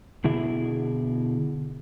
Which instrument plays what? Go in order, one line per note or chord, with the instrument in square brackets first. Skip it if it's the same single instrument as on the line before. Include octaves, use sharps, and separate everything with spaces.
[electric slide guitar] B2 D3 E4 G#4 E5